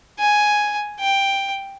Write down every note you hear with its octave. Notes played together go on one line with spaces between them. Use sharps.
G#5
G5